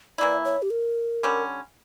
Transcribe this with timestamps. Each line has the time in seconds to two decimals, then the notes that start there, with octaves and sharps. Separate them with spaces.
0.18 E3 A#3 E4 D5
0.45 C#5
0.62 G4
0.70 A#4
1.23 D3 G3 C#4